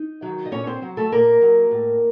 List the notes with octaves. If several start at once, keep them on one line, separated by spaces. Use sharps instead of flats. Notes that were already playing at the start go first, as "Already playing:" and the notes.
Already playing: D#4
D#3 F#3
D#5
A#2 C#4 C#5
C4 C5
F#3
A3 A4
A#2 A#3 A#4
F#3
A2